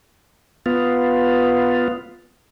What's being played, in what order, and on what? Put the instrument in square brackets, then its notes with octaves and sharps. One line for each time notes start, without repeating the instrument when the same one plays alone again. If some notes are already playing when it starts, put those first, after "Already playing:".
[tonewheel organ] B3 F4